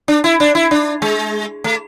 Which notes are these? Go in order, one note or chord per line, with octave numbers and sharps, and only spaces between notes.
D4
E4
D4
E4
D4
G#3
A3